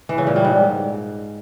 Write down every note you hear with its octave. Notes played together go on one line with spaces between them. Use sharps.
E3
C#3
A#2
G3
G#2